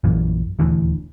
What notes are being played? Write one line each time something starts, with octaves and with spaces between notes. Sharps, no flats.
A#1 F#2 A#2 E3
D#1 D2 E3